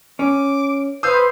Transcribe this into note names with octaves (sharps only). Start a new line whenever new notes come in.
C#4 D6
B4 C5 F5 D#6 E6 G6